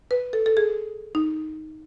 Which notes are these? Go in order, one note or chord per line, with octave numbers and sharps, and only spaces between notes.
B4
A4
A4
G#4
D#4